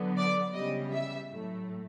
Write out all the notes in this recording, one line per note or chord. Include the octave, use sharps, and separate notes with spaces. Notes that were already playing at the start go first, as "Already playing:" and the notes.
Already playing: D3 F#3 B3
D5
C#3 E3 G3 B3 D#5
E5
A2 F#3 A3